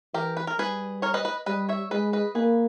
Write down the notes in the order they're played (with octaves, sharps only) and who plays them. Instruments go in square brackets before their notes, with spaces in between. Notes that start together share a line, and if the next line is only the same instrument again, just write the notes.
[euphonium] E3 [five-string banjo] G4 A#4
[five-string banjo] B4
A#4
[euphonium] G3 [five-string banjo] G#4 B4
[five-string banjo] A#4 C#5
B4 D#5
B4 D#5
[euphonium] G3 [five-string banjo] B4 D#5
[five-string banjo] C#5 E5
[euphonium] G#3 [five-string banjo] B4 D#5
[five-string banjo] B4 D#5
[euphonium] A#3 [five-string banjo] G#4 B4